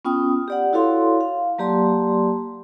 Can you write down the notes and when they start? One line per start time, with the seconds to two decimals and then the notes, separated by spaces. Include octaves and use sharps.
0.05 B3 C#4 F4 G5 D#6
0.48 G4 D5 F#5
0.73 E4 F#4 A4 C#5 F5 C6
1.21 F5
1.58 F#3 A#3 G4 D5 A5 C6